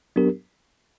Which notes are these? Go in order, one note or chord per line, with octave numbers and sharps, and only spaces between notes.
F#3 B3 D4 G4 A#4